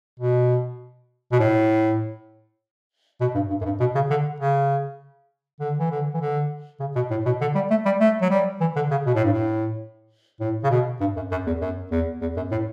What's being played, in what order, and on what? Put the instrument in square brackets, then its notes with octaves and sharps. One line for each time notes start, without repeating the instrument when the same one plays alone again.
[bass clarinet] B2
B2
A2
B2
G2
G2
F#2
G2
B2
C#3
D3
C#3
D3
E3
D3
E3
D3
C#3
B2
A2
B2
D3
G3
A3
G3
A3
F#3
G3
E3
D3
C#3
B2
A2
G2
A2
A2
C#3
B2
G2
F#2
F#2
E2
F#2
E2
E2
F#2
A2